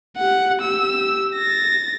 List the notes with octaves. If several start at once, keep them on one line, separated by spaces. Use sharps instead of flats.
G4 F#5
G4 E6
A6 A#6